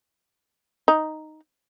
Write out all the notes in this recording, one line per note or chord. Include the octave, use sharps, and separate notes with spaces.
D#4